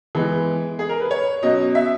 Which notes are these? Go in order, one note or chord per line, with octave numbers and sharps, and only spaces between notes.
E3 G#3 B3
G#4
A#4
B4
C#5
B2 F#3 C#4 D#5
E5